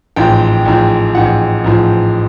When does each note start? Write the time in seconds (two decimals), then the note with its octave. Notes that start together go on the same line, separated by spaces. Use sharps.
0.16 A1 G#2 F3 G5
0.65 A1 G#2 F3
1.15 A1 G#2 F3 F#5
1.64 A1 G#2 F3